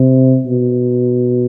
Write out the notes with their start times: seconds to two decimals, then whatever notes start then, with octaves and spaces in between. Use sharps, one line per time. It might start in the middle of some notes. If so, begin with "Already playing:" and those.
Already playing: C3
0.46 B2